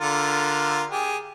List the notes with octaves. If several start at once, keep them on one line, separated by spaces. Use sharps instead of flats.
D3 F4 A#4
G4 G#4